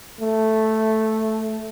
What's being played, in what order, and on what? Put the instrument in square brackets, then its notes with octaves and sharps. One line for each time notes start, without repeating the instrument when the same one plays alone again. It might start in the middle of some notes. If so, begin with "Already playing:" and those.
[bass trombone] A3